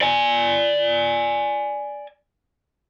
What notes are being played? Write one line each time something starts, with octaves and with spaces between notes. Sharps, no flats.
D5 G#5